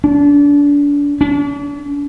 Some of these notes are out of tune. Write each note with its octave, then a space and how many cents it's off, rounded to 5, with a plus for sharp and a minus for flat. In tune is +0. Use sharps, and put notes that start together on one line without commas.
D4 -30
D4 -45